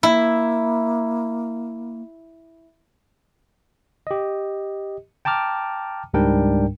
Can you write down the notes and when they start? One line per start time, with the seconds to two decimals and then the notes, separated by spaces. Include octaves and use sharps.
0.03 A#3 E4
4.07 G4 D#5
5.25 G5 A5 A#5 D6 F6
6.14 C#2 G#2 G3 D4 A#4 G5